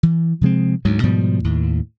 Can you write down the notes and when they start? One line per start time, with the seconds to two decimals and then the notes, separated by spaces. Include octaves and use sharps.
0.03 E3
0.41 C3 F3 G#3 C4
0.85 D2 G#2 F#3
1.03 G#2 B2 F3 G3
1.44 D#2 A2